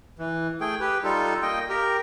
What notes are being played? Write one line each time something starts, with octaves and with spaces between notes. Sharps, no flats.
E3
A3 G#4 G5
G4 B4
G3 D#4 F4 A4
A#3 D#5 G5
G4 A#4